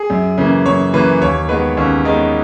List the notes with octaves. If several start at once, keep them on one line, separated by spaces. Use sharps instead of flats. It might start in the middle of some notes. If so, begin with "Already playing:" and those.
Already playing: G#4
F#2
C#3 E3 A#3
F#2 C#5
C#3 E3 A#3 B4
D#2 C#5
D#3 G#3 B3 B4
D#2 C#4
D#3 G#3 B3 D#4